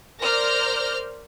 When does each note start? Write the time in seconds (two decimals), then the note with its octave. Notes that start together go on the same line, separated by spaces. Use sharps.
0.21 A#4 C5 D5 F6 G6 A#6